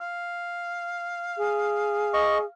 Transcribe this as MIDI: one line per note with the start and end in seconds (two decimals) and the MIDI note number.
0.01 2.52 77
1.38 2.45 68
2.14 2.38 75
2.14 2.38 85